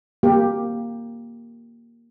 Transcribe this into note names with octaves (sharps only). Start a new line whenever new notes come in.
A#3 G4